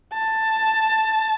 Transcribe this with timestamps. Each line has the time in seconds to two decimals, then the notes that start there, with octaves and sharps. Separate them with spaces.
0.13 A5